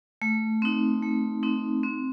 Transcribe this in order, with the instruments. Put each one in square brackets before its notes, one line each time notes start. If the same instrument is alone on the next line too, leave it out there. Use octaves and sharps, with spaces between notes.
[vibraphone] A3
C4 D#4
A3
C4 D#4
C4